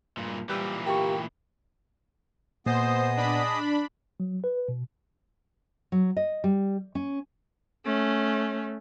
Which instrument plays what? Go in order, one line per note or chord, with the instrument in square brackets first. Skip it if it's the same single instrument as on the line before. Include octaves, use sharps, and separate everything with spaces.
[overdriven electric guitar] G2 A#2
[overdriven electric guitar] A#2 E3 [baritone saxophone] G3 [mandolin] B4 D6 E6
[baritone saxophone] A#3 [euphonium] G4 [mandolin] G5 B5 C#6
[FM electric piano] A#2 [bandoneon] B3 [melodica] G#4 D#5 D#6 [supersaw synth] C5
[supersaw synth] D4 B5
[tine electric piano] F#3
B4
B2
[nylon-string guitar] F#3
D#5
G3
C#4
[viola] A3 C#4